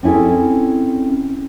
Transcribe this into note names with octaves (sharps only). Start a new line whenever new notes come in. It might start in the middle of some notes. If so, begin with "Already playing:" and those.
C4 C#4 E4 G#4 A4